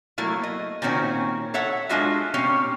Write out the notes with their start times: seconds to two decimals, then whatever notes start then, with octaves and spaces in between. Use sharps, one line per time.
0.18 F#3 A3 A#3 E4
0.43 D#5
0.82 A#2 D#3 C4 C#4 F#4
1.54 A4 C#5 E5 F#5
1.89 G#3 D4 F4 F#4 D#5 E5
2.34 A#2 C4 C#4 G4 C#5